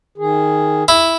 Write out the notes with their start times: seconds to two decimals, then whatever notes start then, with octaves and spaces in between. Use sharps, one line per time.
0.18 D#3 G#4
0.88 E4